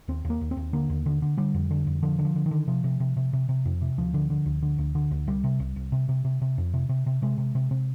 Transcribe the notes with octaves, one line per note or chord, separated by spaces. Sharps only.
D#2 C4
D#2
A#3
D#2
C4
D#2
D3 A#3
D#2
D3
D3
D3 G3
F2
D3
F2
D3 F3
D3
F3
D3
D#3
D3
C3 F3
C3
C3
C3
C3
C3
F2
C3
D2 F3
D3
D3
D2
D3
D2
D3
D2
C2 G3
C3
C2
C2
C3
C3
C3
C3
F2
C3
C3
C3
C3 G#3
C3
C3
C3